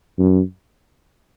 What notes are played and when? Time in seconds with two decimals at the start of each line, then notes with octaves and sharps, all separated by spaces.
0.18 F#2